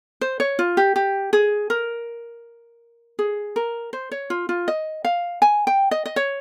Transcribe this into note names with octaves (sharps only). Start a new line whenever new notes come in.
C5
C#5
F4
G4
G4
G#4
A#4
G#4
A#4
C5
C#5
F4
F4
D#5
F5
G#5
G5
D#5
D#5
C#5